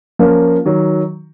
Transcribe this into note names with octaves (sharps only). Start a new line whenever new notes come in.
F3 A#3 C#4 F4 A#4
D#3 F#3